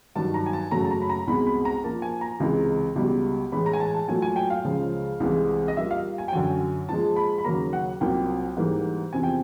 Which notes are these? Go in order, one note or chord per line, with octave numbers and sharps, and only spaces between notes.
G2 D#3 F#3 A5
A#5
G#5
A5
F#2 C#3 F#3 A3 A#5
A5
A#5
B5
A#5
C2 B2 G#3 B5
B5
A#5
A#2 F3 A#3 A5
G#5
A#5
C#2 C3 E3 G#3
C#2 B2 G3
A2 E3 G#3 B5
A#5
G#5
A5
A5
A#2 F#3 A3 G#5
G#5
G5
F5
C#2 C#3 F3 G#3
C2 C3 E3 G#3
D#5
A#2 G3 A#3 E5
F5
G#5
G5
F#2 D3 F#3 G#5
A#2 F3 G#3 A5
B5
B5
D#2 C#3 F#3 A#3 A#5
F#5
C2 A#2 F#3 A#3 G5
G#2 E3 G3 A#3
E2 C3 F3 G#5
G5